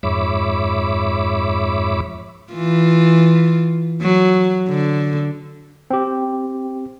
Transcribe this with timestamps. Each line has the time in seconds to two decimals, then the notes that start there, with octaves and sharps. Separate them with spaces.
0.03 F2 G#2 C#5 E5 B5 D6
2.53 E3 F4
4.02 F#3
4.69 D3
5.90 C4 G4